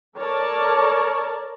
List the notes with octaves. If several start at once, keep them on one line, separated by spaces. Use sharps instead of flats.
A4 A#4 C#5 D5 A5